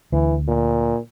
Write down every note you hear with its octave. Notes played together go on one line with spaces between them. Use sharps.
D2 E3
A#2